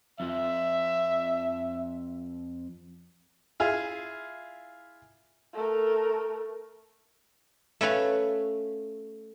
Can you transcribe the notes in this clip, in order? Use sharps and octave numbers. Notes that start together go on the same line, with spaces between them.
F2 F3 E5
E4 F4 G#4
A3 A#4
A3 C#4 B4 F5